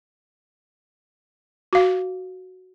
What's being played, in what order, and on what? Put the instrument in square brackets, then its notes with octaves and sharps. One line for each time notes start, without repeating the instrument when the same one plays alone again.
[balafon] F#4 F5